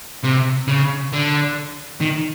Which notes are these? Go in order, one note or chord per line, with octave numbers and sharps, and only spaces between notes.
C3
C#3
D3
D#3